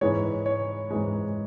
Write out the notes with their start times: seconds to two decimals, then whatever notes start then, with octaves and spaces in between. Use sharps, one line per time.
0.01 G#2 E3 G#3 C#5
0.46 C#5
0.90 G#2 E3 G#3